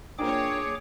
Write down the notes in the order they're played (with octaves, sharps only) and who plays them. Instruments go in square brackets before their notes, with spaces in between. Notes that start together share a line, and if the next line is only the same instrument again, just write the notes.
[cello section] A#3 C#5 [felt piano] D4 F4 A#4 [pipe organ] G#4 D6 [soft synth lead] G5